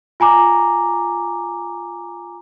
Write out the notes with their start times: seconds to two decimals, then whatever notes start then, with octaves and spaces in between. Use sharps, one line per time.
0.20 F4 G#5 A#5 D6